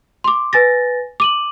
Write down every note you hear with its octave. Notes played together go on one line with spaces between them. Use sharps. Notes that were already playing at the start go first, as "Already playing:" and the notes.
C6 D6
B4 G#5 A6 A#6
D6 D#7 F#7